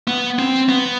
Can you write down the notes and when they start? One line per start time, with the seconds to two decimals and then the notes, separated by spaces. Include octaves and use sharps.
0.08 B3
0.39 C4
0.69 B3